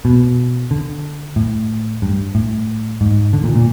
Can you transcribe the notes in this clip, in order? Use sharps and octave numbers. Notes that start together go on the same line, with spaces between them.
B2
D3
A2
G2
A2
G#2
D3
A#2
A#2